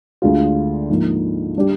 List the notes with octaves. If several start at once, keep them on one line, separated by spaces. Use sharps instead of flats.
D2 D3 G#3 D4 F4
G#2 F3 A#3
G3 D4 G4